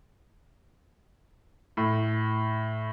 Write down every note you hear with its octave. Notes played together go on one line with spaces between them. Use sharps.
A2